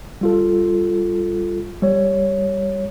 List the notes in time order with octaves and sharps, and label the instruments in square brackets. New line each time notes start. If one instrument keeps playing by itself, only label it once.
[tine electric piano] G3 F4 A4
G3 C#5